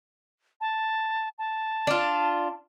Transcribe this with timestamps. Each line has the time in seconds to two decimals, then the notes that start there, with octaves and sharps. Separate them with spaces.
0.61 A5
1.38 A5
1.87 D4 F4